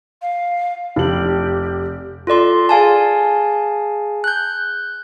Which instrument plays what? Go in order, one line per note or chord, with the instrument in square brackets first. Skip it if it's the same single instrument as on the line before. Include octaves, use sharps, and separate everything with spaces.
[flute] F5
[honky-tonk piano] F1 F#7 [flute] G4
[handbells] F4 A4 D5 C6
G#4 F5 G#5 A5
F#6 G6